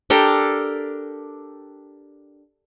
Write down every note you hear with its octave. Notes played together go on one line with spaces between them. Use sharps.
D4 G4 A4 A#4